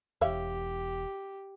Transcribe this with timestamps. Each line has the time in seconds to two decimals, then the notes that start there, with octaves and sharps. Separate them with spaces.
0.21 E1 E2 G4 C#5 E5 F5